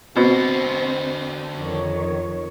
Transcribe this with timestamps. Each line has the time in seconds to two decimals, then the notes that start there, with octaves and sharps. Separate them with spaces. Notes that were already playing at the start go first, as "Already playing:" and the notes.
0.16 B2 D3 C4 C5
1.55 F2 D#3 C#5